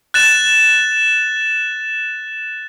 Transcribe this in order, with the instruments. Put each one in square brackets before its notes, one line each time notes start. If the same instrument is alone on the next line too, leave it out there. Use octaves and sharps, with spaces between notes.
[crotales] F#6 A6 E7